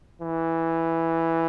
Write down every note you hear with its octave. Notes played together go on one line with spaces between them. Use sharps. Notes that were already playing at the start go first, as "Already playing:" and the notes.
E3